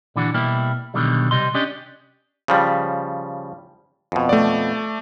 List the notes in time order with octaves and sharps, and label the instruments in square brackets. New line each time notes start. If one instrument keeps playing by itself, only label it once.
[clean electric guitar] A#2 D3 E3 D4 F#4
B2 G3 A#3 E4 G4
B1 B2 D3 D#3 G3
C3 G3 D#5 C6
C#4 D4 G4 D5 D#5
[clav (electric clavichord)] C#3 F3 G3
F2 B2
[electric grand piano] A3 D5